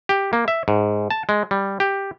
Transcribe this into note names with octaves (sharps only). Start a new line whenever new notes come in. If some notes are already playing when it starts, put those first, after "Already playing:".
G4
A#3
E5
G#2
A5
G#3
G3
G4